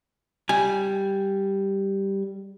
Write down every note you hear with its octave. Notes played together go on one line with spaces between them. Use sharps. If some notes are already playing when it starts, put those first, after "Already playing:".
G3 G#5